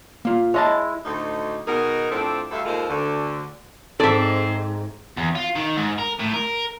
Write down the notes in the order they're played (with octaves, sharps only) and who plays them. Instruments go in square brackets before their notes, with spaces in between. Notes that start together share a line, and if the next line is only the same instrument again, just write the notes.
[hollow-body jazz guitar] A#3 F4
[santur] G#3 E4 [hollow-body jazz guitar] C#5 D#5 A5
[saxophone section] D2 A2 D#4
B2 D#3 D#4 G#4 A#4
A2 F3 C4 D4 A4 E5
D2 G2 D3 A4 E5 F5
D#2 D#3 G#3 F4 A4 C5
D2 D3
[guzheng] G#2 [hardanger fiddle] C4 [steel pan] A4 [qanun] D5 E5
[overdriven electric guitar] E2
F4
D#3
G#2
A#4
A2
A#4